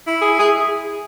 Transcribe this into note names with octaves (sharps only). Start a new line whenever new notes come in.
E4
G#4
G#4